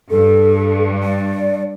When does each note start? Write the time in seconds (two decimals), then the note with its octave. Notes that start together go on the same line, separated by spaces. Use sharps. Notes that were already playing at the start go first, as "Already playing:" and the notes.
0.10 G2 A4
1.02 D5